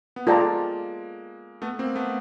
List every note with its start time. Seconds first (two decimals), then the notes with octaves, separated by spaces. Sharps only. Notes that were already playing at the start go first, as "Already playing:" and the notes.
0.16 B3
0.27 G#3 A#3 F4 A4 D5 G5 A#5
1.62 A3 B3
1.79 A#3 C4
1.95 A3 B3